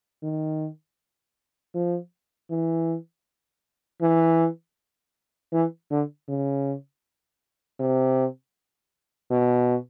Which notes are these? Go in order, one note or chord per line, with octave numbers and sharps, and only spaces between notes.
D#3
F3
E3
E3
E3
D3
C#3
C3
B2